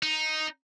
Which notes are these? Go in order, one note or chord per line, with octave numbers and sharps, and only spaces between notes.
D#4